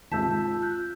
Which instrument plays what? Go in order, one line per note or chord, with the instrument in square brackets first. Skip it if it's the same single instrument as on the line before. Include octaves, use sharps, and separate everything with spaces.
[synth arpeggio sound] D#2 G#2 C3 [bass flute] F4 [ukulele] A5 [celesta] E6 G6 B6
[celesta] F#6 G6